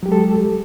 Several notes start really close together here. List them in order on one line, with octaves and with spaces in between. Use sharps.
F#3 G4 G#3 A4